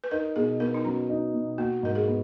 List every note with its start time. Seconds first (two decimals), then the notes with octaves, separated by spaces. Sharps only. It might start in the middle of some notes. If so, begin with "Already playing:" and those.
0.04 B4
0.11 D#4 A#4
0.36 B2 G#4
0.60 B3 A#4
0.74 D#4
0.85 F#3 C#4
1.09 D#4
1.34 B2
1.58 A#3 F#4
1.83 G#2 A#4
1.95 G#4
2.07 B3